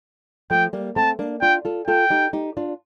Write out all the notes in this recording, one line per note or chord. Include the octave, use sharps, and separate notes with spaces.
F3 A3 G5
G3 A#3
A3 C4 A5
A#3 D4
D4 F4 G5
F4 A4
F4 A4 G5
D#4 G4
D#4 G4
D4 F4